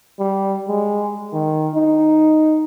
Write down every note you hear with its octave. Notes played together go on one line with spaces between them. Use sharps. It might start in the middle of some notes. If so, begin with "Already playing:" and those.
G3
G#3
D#3
D#4